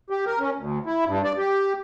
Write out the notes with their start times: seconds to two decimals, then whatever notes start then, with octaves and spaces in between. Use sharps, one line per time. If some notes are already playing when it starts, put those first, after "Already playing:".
0.10 G4
0.26 A#4
0.39 C#4
0.57 D2
0.86 E4
1.06 G2
1.24 D5
1.37 G4